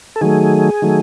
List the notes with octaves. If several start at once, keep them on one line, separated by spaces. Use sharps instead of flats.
A4
D#3 F#3 A3 G#4
D#3 F#3 A3